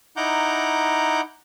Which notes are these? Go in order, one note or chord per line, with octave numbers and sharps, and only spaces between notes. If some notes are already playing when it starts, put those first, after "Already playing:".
D#4 E4 F#5 A#5 D6 G6